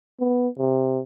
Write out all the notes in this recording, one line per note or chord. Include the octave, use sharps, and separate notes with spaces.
B3
C3